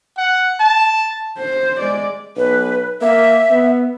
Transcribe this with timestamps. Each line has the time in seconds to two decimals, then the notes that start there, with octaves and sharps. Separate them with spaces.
0.18 F#5
0.60 A5
1.39 C5
1.80 G#3 D5
2.37 B1 B4
3.02 A#3 E5
3.51 B3